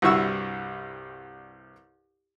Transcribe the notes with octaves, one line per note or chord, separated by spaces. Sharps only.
C2 G2 E4 F#4 C#6 E6